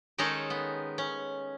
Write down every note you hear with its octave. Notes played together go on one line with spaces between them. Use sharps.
D#3 G#3 C#4 D#4 G#4 A4
B3
C#4